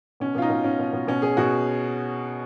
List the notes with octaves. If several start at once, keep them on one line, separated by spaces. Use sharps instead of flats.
B2 C#4
B2 F4
D#4
B2
B2 C#4
B2
B2
B2 C#4
B2 G#4
B2 F#4